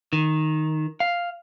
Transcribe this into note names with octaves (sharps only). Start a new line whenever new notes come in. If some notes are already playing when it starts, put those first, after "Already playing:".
D#3
F5